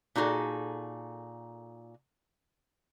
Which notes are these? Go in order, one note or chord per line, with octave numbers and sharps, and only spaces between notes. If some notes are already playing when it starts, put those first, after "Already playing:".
A#2 D#4 F#4 G#4 A4